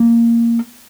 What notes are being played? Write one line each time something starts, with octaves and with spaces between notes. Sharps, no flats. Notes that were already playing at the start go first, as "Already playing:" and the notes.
Already playing: A#3